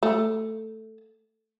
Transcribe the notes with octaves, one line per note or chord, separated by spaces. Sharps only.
A3